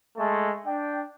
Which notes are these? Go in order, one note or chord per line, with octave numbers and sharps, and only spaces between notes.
G#3 A3 A4
D4 G5